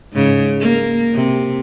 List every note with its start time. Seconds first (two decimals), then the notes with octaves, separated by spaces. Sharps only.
0.13 G#2 C#3
0.61 A#3
1.14 C3